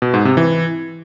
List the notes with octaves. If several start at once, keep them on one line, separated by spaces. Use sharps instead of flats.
B2
G#2
C3
E3